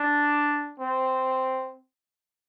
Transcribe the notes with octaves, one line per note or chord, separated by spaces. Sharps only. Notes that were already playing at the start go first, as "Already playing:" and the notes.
Already playing: D4
C4